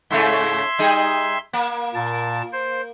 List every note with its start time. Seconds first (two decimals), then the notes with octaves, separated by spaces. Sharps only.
0.11 G#2 C#3 A3 E5 C6 G#6
0.79 G3 D#4 G#4
1.53 A#3
1.94 A#2 A5
2.52 C5